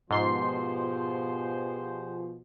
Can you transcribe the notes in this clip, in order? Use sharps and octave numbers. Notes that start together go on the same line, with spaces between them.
G#2 B2 F3 G4 G#4 C5 C6 C7